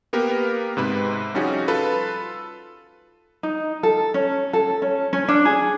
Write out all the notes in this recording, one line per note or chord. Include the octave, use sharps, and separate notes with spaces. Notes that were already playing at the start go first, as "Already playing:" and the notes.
A#3 B3 G4 A#4
G#2 C3 B4 B5
F3 G3 C#4 D#4 F#4 G#4
F4 A4 B4
D#4
A4
C#4
A4
C#4
C#4
D4
G#4